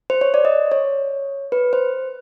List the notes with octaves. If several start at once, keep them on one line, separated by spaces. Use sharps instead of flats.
C5
C#5
D5
D#5
C#5
B4
C5